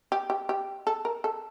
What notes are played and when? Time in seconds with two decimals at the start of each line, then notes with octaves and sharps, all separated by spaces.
0.12 G4
0.30 G4
0.49 G4
0.87 A4
1.05 A#4
1.24 A4